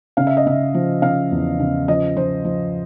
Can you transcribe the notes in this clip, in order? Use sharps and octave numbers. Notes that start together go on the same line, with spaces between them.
C#3 F5
E5
D#5
C#3 E5
F3
C#3 F5
E2
C#3
F3 D#5
F3 C5
F3